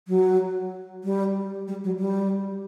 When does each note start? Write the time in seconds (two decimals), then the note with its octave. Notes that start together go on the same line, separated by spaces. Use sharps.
0.08 F#3
1.04 G3
1.68 G3
1.84 F#3
2.00 G3